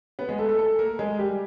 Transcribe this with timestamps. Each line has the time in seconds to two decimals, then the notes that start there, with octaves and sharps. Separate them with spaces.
0.19 B3 B4
0.29 G#3 G#4
0.38 A3 A4
0.49 A3 A4
0.59 A3 A4
0.79 A#3 A#4
0.99 G#3 G#4
1.19 G3 G4